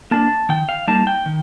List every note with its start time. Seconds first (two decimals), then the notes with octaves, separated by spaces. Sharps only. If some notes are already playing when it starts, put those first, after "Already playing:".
0.11 A#3 D4 A5
0.49 D#3 G5
0.69 F5
0.88 G3 A#3 D#4 A5
1.07 G5
1.26 D#3